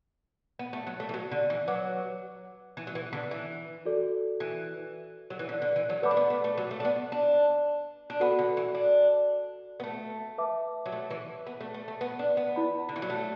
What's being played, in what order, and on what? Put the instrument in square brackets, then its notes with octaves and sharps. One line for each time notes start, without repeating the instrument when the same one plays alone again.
[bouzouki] B3
A3
F#3
A3
E3
F#3
D3
E3
[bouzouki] F#3 [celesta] B4 F#5 D6
[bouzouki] E3
F#3
E3
D3
E3
[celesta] F#4 A4 D5
[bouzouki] E3
F#3
E3
D3
D3
E3
F#3
[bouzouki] A3 [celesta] B4 D5 F#5 B5 D6
[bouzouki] D4
B3
A3
A3
F#3
A3
D4
B3
D4
D4
[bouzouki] B3 [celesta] F#4 A4 F#5 B5
[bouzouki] D3
E3
D4
B3
A3
[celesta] B4 E5 A5 D6
[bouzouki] F#3
A3
E3
B3
A3
A3
A3
B3
D4
B3
[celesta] E4 D5 B5
[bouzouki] D3
E3
F#3
A3